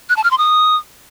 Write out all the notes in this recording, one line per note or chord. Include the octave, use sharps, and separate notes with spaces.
F#6
A5
F6
C6
D#6